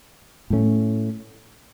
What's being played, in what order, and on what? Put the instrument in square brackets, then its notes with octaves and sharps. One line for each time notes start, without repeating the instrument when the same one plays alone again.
[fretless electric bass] A2 A3 C#4